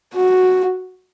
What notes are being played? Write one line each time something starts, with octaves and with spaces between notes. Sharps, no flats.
F#4